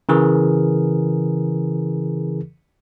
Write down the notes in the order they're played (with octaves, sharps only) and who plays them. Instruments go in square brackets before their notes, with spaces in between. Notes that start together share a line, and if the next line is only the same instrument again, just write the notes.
[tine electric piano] C#3 E3 G#4 A#4